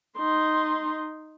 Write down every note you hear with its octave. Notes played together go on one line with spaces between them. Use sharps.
D#4 C6